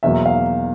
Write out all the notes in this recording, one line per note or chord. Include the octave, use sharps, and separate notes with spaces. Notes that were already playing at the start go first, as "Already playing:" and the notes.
E2 B2 F#3 A#3 E5
F5